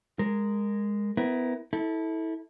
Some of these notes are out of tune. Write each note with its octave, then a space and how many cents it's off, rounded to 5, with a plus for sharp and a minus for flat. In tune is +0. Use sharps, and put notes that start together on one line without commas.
G#3 -10 A#4 +0
B3 +30 E4 +0 A#4 +15
E4 -25 A4 +0